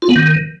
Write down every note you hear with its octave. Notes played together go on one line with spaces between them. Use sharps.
F4
B3
D#3